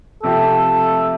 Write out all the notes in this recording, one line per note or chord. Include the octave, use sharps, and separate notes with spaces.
C3 F3 A3 C4 G4 A4